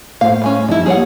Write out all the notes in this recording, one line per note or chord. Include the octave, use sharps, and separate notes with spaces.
A2 C5 F5
G3 G#3 C#4
F2 G3 D#4 E4
G3 A#3 G#4 C#5 F#5